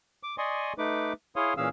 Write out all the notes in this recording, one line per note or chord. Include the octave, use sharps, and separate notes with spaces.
D6
D5 D#5 G#5 C6 C#6 D#6
A3 D#4 B4 D6
E4 G#4 C#5 F5 C6 D#6
A#2 E3 C#4 G#4 F5 E6